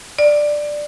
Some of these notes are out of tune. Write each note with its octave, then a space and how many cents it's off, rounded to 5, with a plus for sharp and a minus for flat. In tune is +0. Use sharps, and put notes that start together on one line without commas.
D5 +10